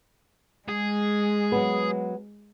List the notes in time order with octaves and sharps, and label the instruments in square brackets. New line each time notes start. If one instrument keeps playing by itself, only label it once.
[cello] G#3 [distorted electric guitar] G#4
[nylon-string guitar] F#3 B3